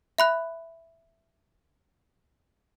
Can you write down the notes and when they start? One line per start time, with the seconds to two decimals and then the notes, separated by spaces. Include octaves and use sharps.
0.18 E5 B5 F#6